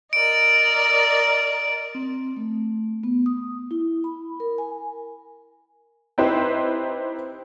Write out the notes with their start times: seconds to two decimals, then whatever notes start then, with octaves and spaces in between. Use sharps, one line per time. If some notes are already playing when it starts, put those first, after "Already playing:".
0.13 A#4 D5 D#5 D7
1.95 C4
2.37 A3
3.03 B3
3.26 D#6
3.71 E4
4.04 B5
4.40 A#4
4.58 G#5
6.18 C4 D#4 E4 G4 B4 C5